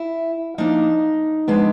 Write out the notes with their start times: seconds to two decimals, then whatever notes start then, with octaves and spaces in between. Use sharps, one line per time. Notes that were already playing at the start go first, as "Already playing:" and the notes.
Already playing: E4
0.58 F3 A#3 D4 D#4
1.48 F3 G#3 B3 D4